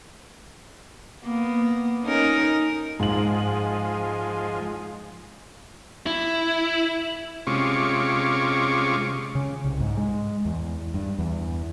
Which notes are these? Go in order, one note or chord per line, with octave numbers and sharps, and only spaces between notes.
A#3 B3
C#4 D#4 A#4
G#2 F3 G#3 F#7
E4
C3 G#3 C#4 F4 C#6 D6
C#3
C2
G#2
G#3
E2
G2
E2